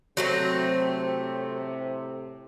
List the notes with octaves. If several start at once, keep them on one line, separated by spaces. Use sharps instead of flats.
A2 C3 F#3 A3 C4